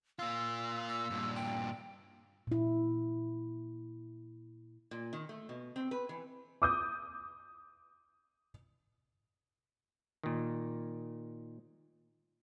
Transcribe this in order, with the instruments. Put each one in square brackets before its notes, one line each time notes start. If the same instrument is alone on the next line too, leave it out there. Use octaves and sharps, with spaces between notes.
[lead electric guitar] A#3 F4 [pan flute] E6
[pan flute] E6
[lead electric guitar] G2 A#2
[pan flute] G5
[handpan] A#2 E4
[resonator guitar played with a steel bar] A#2
D#3
A3
B2
C4
B4
E3
[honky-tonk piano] D6 D#6 G6
[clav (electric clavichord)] A#2 D#3